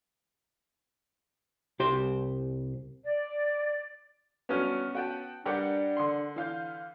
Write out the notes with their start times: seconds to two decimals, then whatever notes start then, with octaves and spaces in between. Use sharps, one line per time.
1.80 C2 G4 C5
3.04 D5
4.49 G2 F#3 B3 C#4 F6
4.95 F#4 G5 A5
5.46 G2 G3 D4 G4 A#4 F#5
5.97 D3 C6
6.36 E3 F5 G6